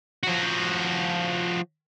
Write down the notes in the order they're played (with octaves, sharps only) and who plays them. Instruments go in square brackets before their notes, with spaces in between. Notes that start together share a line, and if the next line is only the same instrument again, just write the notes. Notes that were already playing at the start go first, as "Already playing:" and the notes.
[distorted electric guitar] F3 F#4